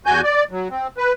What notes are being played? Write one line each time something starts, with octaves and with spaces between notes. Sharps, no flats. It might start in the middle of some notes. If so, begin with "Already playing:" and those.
E2 F#4 G#5 G6
D5
F#3
C4
B4